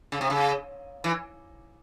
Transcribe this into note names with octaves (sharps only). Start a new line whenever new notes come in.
C#3
C3
C#3
E3